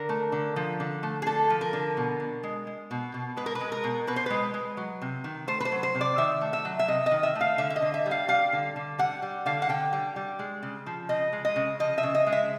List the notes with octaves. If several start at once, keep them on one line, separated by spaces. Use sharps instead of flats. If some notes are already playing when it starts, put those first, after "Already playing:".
Already playing: D3 A#4
A3
D3
F3
D3
A3
G#4
D3 A4
F3
A#4
D3
B2
B2
G#3
G#3
B2
B2
G#3 B4
A#4
B4
G#3
A#4
B2
B2 B4
C5
G#3 B4
G#3
F#3
C3
D#3
A3 C5
B4
C5
F#3
C5
C3
D5
D#3 E5
A3
E5
F#3
E5
C3 D#5
D#5
D#3
E5
A3
F5
D3 E5
E5
D#5
D3
E5
G3
F5
G3 F5
D3
D3
G3 F#5
G3
D3 F5
F#5
D3 G5
G3
G3
G#3
C#3
F3
C#3 D#5
G#3
D#5
C#3
F3 D#5
E5
C#3
D#5
G#3
E5